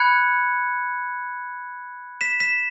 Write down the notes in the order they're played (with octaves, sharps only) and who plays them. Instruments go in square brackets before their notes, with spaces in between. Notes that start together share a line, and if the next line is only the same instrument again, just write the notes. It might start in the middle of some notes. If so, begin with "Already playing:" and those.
Already playing: [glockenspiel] B5 F#6 G#6 C#7
B6 E7
B6 E7